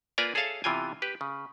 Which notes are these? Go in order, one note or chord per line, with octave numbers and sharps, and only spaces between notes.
A#3 F4 B4 D5 G#5 A#5
G#4 A4 C#5 E5 F5 A5
C3 E3 B3 F4 G5 G#5
G4 B4
C#3